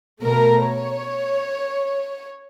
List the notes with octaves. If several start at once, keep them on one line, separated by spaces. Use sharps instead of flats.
B2 A3 A#4 A#5
C#5